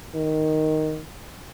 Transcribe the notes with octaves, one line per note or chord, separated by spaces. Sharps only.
D#3